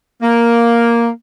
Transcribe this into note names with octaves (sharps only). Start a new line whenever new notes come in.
A#3